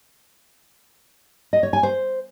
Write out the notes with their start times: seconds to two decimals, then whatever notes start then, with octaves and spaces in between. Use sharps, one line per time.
1.53 D#5
1.63 C#5
1.73 G#5
1.83 C5